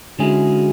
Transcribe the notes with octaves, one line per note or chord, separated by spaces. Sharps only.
D3 G#3 C#4 E4 F#4 G#4